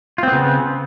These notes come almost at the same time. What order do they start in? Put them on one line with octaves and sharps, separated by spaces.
F4 C4 B3 C#3